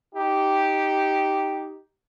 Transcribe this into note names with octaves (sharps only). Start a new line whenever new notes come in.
D#4 G4